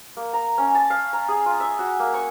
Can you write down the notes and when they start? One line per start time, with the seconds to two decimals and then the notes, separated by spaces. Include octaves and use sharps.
0.17 A#3
0.33 A#5
0.58 C#4
0.75 A5
0.90 F5
1.13 A#5
1.28 G#4
1.46 F4
1.60 E5
1.79 F#4
2.00 A#3
2.14 C#6